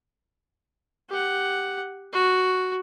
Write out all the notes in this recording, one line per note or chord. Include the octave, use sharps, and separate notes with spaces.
G4 F#5
F#4